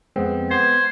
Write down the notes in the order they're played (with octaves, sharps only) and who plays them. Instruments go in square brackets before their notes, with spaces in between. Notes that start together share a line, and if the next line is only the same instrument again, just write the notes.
[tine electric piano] F2 B3 C4 [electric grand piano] G#3
[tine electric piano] B3 [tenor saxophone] C5 [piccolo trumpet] G#6